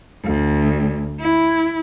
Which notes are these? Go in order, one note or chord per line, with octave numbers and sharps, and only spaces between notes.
D2
E4